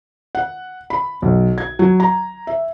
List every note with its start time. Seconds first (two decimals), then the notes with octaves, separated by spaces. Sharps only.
0.35 F#5
0.90 B5
1.22 B1
1.58 G#6
1.79 F#3
2.00 A#5
2.47 E5